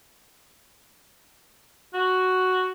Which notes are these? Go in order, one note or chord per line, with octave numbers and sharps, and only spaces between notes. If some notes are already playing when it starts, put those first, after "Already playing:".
F#4